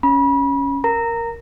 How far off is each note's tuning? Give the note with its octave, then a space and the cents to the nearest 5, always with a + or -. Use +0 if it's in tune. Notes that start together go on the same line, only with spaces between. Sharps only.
C#4 +0 B5 -30
A#4 +0 A#5 -15